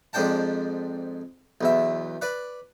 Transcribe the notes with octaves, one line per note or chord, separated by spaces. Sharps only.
F2 G#2 D4 C5 G5 A5
B1 E2 E5
B4 D5